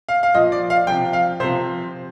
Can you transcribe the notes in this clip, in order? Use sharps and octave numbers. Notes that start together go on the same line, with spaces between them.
F5
F5
A#2 F3 D#5
D5
F5
C3 F3 G5
F5
C3 F3 C5